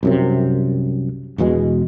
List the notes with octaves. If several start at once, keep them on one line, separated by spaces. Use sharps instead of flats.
C2 F#2 C3
E1 E2 B2 G#3